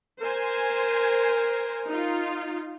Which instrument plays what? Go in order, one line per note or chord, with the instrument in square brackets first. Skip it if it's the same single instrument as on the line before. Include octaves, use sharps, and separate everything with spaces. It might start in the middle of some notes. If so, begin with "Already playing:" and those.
[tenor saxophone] A#4 [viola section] C5 G#5
[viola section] D#4 F4